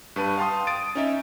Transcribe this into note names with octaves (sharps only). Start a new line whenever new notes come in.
G2 B4 A5 D#7
F5 G5 A5 C6 D#6
D#6 A6 D7
C#4 D#4 E5